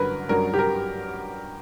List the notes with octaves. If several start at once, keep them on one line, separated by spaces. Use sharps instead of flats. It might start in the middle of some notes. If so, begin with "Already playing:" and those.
Already playing: G2 D3 F#3 C#4 A#4 B4
G2 F#3 C#4 A#4
G4
A#4